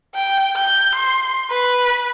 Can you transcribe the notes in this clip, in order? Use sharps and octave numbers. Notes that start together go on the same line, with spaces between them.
G5
G6
C6
B4